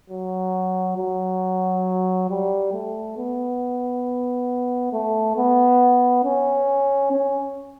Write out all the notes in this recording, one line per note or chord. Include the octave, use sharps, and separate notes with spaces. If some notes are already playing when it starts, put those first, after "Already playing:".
F#3
F#3
G3
A3
B3
A3
B3
C#4
C#4